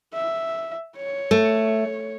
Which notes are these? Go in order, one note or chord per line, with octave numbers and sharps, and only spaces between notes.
E5
C#5
A3